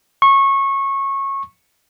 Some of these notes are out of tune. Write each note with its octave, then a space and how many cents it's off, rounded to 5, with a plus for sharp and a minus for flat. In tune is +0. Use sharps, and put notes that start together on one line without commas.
C#6 -20